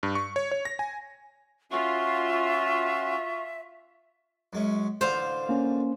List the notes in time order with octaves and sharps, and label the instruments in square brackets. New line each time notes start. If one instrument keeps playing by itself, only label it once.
[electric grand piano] G2
C#6
C#5
C#5
A#6
G#5
[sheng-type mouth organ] C#4 F#4 C6 [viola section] F4 [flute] E5 [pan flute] C#6
[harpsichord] F#2 G#3 C#4
[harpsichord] A1 D3 F4 [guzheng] C5 F5
[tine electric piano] A#3 C#4